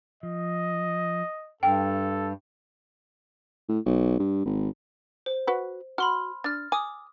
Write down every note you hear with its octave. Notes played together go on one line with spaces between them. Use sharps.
F3 D#5
G2 A4 F5 G5
A2
B1
G2
G#1
C5
F#4 B4
F#4 B5 C6 F6
D4 F6 A6
G#5 D6 D#6